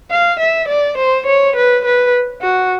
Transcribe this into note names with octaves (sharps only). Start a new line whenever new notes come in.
F5
E5
D5
C5
C#5
B4
B4
F#4